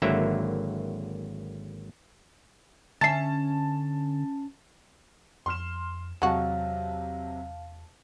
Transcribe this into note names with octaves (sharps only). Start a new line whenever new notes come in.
G#1 D3 F#3 A#3 E4 E5
D3 C#4 E5 A5 A6 C7
F2 C6 F6 E7
E2 C3 F#3 G#3 F#4 F5 A5